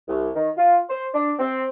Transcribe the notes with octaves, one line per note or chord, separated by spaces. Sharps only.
C2
D#3
F4
C5
D4
C4